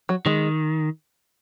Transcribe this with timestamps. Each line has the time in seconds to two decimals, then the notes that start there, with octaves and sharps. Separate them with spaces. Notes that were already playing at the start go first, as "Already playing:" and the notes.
0.09 F#3
0.26 D#3 G#3